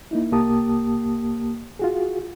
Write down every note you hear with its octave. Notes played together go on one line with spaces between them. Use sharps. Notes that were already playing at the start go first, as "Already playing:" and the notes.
A#3 D#4 E4
C2 A#3 G4 A5 D#6
F4 F#4 G#4